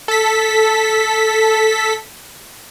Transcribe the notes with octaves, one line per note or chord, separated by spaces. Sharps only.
A4 B6